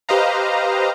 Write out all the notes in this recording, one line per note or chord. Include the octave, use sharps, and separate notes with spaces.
G4 B4 C5 D#5 F5 A#5